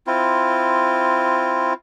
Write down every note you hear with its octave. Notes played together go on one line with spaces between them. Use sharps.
C4 E4 F4